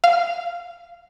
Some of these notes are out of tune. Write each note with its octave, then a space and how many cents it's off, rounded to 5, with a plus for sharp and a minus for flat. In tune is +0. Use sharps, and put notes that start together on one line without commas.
F5 -10